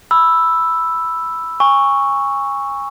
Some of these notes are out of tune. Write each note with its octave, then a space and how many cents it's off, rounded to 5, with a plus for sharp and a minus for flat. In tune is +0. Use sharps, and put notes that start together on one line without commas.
B5 +0 E6 +0
G#5 -30 C#6 +0